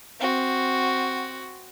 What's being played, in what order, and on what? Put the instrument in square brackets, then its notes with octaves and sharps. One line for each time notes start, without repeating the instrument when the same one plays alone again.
[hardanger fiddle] C4 F#4